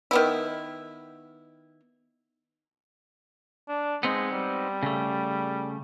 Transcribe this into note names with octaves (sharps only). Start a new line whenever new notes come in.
D#3 B3 E4
D4
G#3 B3 C4 D#4
G3
C#3 A3